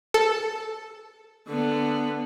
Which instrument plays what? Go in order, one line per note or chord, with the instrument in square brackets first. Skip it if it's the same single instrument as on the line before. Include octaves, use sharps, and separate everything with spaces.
[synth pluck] A4
[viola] D3 B3